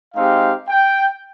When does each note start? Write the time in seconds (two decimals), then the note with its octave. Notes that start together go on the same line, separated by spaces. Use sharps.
0.15 G#3 C4 D#4 G4 F5
0.69 G5